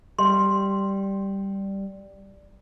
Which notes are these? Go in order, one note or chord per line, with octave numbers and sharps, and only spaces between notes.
G3 C6